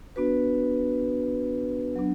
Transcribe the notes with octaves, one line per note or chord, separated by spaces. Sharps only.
B3 D4 F#4 B4
F#3 B3 D4